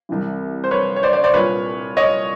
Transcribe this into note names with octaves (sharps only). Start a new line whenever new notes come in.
C2 C3 E3
C5
B4 C#5
C#5
C5 D5
C5 D5
C5 D5
C2 A#2 B4 C#5
C#5 D#5